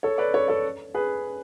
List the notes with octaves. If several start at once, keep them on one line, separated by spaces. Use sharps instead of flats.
A4 C#5
B4 D5
A4 C#5
A4 C#5
G#4 B4